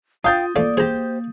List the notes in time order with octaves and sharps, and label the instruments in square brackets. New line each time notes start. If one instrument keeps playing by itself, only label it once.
[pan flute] F4 [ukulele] F5 G5 [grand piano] D#6 G6 A6
[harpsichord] F3 A3 [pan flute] A#3 [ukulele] D5
[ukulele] G4 C5 [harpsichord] G#4 A#5